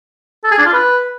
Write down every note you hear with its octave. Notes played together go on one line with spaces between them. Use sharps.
A4
G#4
D4
F4
B4